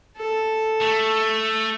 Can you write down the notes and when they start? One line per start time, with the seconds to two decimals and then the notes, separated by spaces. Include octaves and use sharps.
0.17 A4
0.82 A3